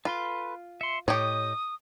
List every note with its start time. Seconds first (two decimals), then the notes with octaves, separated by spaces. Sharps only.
0.05 F4 A4 B4 C6
0.81 E5 C6 C#7
1.08 A2 G4 C#5 D#5 D#6